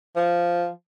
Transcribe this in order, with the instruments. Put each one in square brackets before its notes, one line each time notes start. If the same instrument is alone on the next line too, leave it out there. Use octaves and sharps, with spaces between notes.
[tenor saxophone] F3